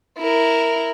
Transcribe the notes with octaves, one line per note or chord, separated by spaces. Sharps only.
E4 A#4